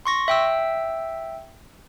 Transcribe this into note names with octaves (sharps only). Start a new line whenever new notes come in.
C6 C#6 A#6
E5 G5 E6